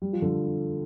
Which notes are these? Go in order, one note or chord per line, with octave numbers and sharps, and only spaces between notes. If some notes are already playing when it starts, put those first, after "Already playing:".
G3
F3
D3